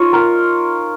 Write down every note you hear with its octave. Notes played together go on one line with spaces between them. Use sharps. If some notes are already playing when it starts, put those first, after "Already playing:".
Already playing: D#4 F4 C#5
A#4